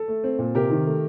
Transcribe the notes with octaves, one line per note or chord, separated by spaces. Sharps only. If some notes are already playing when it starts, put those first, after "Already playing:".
Already playing: A4
A3
C4
A#2
C3 G4 A#4
D#3
A3